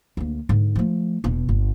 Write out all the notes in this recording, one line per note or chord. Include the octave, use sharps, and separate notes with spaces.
D2 A#3
G#2 D3
F3 A3
E1 B2
G1